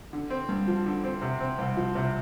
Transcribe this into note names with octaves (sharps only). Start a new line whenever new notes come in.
D3
C4
G2
F3
D3
C4
C3
C4
C2
F3
C3